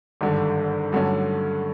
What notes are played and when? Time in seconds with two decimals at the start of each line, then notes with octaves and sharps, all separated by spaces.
0.21 G#1 G2 D3
0.92 G2 D3 F#3 A3 C#4